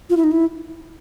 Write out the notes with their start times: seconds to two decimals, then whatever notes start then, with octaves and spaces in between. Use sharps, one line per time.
0.10 F4
0.17 E4
0.24 D#4
0.32 E4